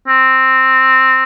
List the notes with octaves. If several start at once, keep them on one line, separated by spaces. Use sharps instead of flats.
C4